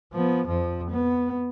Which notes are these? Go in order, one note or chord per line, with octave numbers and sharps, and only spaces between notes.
F3 B3
F2 F3
B3